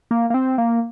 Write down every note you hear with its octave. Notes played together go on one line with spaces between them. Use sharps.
A#3
A#3
C4
A#3